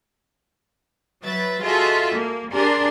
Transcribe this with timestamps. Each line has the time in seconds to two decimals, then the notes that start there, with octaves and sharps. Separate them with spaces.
1.24 F#3 B4 E5 A6
1.63 F4 F#4 G#4 A4 D#5 E5
2.17 A#3
2.53 D4 G4 G#4 A#4 C6